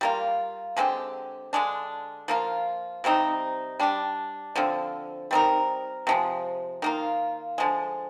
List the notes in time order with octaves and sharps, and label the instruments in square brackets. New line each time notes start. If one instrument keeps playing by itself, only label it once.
[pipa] G3 A#3 F4
D3 G#3 C4 G4
D3 G#3 D4
F3 A#3 F4
C3 G3 C4 D#4
G3 D4 G4
D3 F3 C4
G3 C4 D#4 A#4
C3 F3 G#3
D#3 A#3 F4
D3 F3 G#3